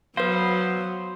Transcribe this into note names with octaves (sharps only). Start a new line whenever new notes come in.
F#3 B3 B4 C5 F5